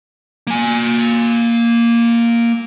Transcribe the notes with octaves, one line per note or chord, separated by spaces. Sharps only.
A#3 G#5